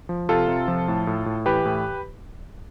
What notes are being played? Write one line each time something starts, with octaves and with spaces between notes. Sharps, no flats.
F3
C3 F4 A4
C3
F3
A2
A2
A2
E3 G4 B4
A2